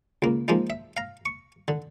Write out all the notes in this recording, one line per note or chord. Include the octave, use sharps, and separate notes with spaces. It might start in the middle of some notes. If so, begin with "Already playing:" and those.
C#2 A#3
F3 G#3 A#3 D#4
E5
F5 A#5
C#6
D3